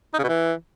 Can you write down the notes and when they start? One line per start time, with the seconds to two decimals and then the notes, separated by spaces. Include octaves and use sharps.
0.14 D#4
0.19 C#3
0.24 B2
0.29 E3